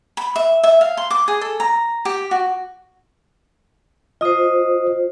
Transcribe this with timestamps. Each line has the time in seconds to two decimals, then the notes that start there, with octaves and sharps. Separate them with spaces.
0.17 B5
0.36 E5
0.64 E5
0.81 F5
0.97 C6
1.10 D6
1.28 G#4
1.41 A4
1.60 A#5
2.05 G4
2.31 F#4
4.21 F4 C5 D#5 D#6